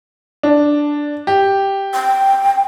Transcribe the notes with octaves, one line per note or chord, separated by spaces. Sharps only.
D4
G4
G5